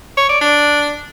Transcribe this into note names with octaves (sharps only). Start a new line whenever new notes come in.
C#5
D5
D4